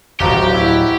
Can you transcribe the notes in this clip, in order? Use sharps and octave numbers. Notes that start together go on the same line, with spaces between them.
D1 G1 F3 F#4 G4 A#5 D6
E4